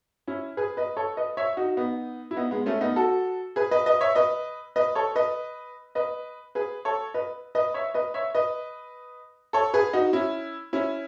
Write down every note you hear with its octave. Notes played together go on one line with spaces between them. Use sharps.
C#4 E4
G#4 B4
B4 D#5
A4 C#5
B4 D#5
C#5 E5
D#4 F#4
B3 D#4
E4
B3 D#4
G#3 B3
A3 C#4
B3 D#4
F#4 A4
G#4 B4
B4 D#5
B4 D#5
C#5 E5
B4 D#5
B4 D#5
A4 C#5
B4 D#5
B4 D#5
G#4 B4
A4 C#5
B4 D#5
B4 D#5
C#5 E5
B4 D#5
C#5 E5
B4 D#5
A4 C#5
G#4 B4
D#4 F#4
C#4 E4
C#4 E4